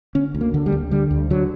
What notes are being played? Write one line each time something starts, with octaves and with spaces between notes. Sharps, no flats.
D3 C#4
D2
A#3
D3
G3
D2
D3 G3
D2
D3 F#3